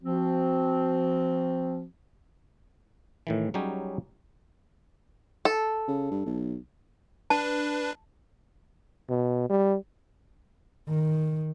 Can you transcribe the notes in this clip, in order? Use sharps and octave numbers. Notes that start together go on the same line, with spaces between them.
F3 C4 F#4
A2 D#3 E3
F#3 G3 C#4 D#4 G4 G#4
A4
C#3
G2
B1
D4 B4 A5
B2
G3
D#3